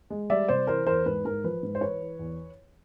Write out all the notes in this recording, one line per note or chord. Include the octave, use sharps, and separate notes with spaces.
G#3
G3 D5 E5
C3 C5 D5
E3 A#4 C5
E2 A#4 C5
G#2 B4
G#2 A#4
F3 B4
G#2
C5
E3 B4 C#5
E3
E2